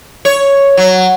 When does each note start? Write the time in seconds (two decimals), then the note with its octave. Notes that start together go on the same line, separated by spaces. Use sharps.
0.25 C#5
0.77 F#3